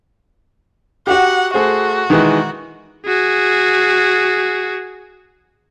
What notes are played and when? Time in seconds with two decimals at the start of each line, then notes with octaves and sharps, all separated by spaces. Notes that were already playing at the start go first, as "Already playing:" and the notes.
1.07 F#4 G4 F#5
1.54 A3 F#4 G#4 C5
2.10 D#3 E3 G#3
3.06 F#4 G#4